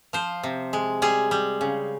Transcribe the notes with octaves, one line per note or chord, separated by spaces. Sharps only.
F3 C5
C3
G#3
G3 G#4
G3
C#3